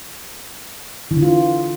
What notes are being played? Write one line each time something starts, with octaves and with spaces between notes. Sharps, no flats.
E3
D3
F4